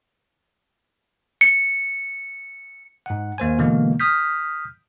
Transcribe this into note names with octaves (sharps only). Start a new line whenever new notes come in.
C#7
G#2 F#5
D#2 A#3 C5 G#5
B2 D3 E3 G#3 A#3 B3
D#6 F6 G6 B6